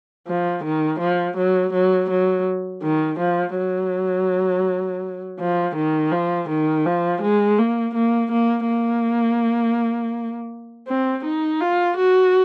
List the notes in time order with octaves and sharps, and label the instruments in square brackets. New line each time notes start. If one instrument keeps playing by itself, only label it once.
[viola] F3
D#3
F3
F#3
F#3
F#3
D#3
F3
F#3
F3
D#3
F3
D#3
F3
G#3
A#3
A#3
A#3
A#3
C4
D#4
F4
F#4